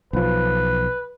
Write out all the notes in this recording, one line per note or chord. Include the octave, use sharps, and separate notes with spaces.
B1 F3 B4